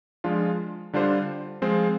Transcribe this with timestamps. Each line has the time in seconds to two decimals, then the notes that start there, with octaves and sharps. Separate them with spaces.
0.24 F3 G#3 D4 F4
0.93 D3 G3 D4 F4 C5
1.62 F3 G#3 C4 F4 C5